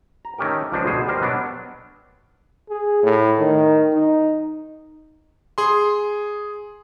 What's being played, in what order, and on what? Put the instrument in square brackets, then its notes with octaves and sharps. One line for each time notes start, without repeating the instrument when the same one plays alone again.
[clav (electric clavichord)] A#5
D#3 A3 C#4 G4 A#4
C#2 F3 D4 D#4
D2 B2 G#4 C5
G3 G4 A#4 C5
B2 F#3 B3 D4
[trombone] G#4
A2
D#3
D#4
[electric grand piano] G#4 C6